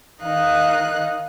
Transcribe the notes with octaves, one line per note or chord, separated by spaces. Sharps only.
D#3 D#4 D#5 F5 F#6